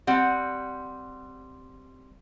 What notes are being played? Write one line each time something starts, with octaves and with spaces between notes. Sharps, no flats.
G3 C4 F#5